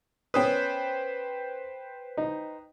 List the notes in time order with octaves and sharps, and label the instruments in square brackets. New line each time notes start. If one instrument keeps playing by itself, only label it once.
[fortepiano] B3 C#4 D#6 [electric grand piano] B4 C5 G5
[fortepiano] D#4